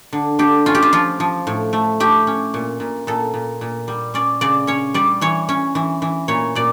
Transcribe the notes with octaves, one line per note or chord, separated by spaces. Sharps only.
D3
D3 G4
C#4 F4
G4
F4
F3 F4
F3
A2
A3
A3 G4
C#4
A#2
A#2
A#2 A4
A#2
A#2
G3
C#4 D5
C#3 D5
C#4 C#5
G3 D5
E3 C#5
C#4
E3
E3
A#2 C#5
A#2 D5